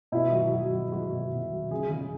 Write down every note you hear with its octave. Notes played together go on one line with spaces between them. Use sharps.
B2 E4
F#3
F#3
F#3
F#3 F#4
B2
B2
F#3
C#3 G#4
C#3